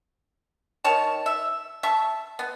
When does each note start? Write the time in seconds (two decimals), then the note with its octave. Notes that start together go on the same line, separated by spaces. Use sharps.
0.84 D#3 C#5 A5
1.26 E5
1.83 E5 A5 C#6
2.39 B3